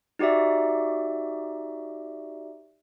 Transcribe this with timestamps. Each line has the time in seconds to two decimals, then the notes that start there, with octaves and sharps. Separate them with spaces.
0.19 D#4 F#4 G4 D5 E5